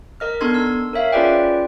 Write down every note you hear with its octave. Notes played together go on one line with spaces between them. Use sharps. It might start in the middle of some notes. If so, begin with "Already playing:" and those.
A#4 D#5 F6
B3 D4 D#4 A4 C6 G#6
E6
A#4 C#5 E5 F5
C#4 F4 G#4 B4 D5 G5